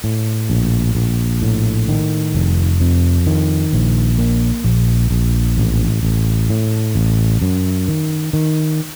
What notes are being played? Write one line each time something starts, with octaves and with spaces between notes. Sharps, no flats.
A2
A#1
A#1
A2
D#3
F1
F2
D#3
A#1
A#3
A#1
A#1
A1
A1
A2
A1
F#2
D#3
D#3